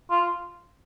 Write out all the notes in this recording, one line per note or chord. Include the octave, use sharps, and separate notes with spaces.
F4